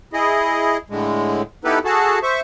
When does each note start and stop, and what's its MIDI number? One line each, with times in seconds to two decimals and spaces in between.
0.13 0.77 64
0.13 0.77 68
0.13 0.77 75
0.90 1.42 45
0.90 1.42 50
0.90 1.42 56
1.65 1.79 59
1.65 1.79 63
1.65 1.79 64
1.65 1.79 67
1.65 1.79 69
1.65 1.79 71
1.85 2.19 66
1.85 2.19 68
1.85 2.19 69
1.85 2.19 81
2.23 2.41 72
2.23 2.41 76
2.23 2.41 85